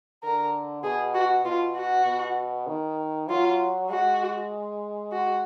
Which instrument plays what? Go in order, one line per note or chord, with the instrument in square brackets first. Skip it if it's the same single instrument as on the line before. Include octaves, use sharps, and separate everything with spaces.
[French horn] D3 [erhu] A#4
[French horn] B2 [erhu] G#4
[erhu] F#4
[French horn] B2 [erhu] F4
[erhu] F#4
[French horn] B2
D#3
[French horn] F#3 [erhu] F4
[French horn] G#3 [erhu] F#4
[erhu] F#4